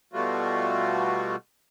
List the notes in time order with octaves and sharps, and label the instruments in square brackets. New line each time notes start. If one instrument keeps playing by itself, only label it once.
[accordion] B2 G3 A3 F4 F#4